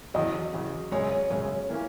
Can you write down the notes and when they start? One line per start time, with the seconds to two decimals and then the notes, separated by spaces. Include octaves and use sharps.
0.14 E2 C#3 F#3 D#5
0.53 E2 C#3 F#3
0.91 F#2 C#3 G#3 C#5
1.12 C#5
1.30 F#2 C#3 G#3 C#5
1.69 E3 A#3 C#4